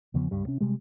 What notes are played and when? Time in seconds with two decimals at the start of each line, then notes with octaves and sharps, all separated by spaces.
0.14 E2 C#3 F3 B3
0.31 C#2 G2 G3
0.47 C3 C#4
0.60 C3 G3 G#3